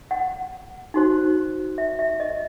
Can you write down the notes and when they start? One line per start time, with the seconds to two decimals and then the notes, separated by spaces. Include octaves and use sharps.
0.11 F#5
0.94 D#4 F#4 C5
1.78 E5
1.99 E5
2.20 D#5